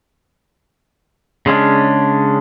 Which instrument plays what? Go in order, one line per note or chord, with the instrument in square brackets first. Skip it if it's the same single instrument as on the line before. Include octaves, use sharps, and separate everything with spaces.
[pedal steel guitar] C#3 G#3 C#4 D4